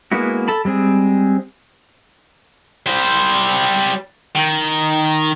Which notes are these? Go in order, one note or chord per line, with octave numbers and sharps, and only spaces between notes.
G#3 A#3 B3 E4 F#4
A4 A5 B5
G3 G#3 C4 G#4
G3 C5
D#3